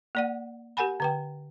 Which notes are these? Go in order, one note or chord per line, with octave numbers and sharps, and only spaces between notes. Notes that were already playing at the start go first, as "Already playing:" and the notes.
A#3 D5 F#5
G4 A#4 F#5 G#5 B5
D3 B4 G5